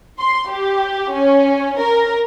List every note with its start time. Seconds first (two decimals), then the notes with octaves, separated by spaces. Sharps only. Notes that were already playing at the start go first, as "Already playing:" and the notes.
0.20 C6
0.51 G4
1.14 C#4
1.81 A#4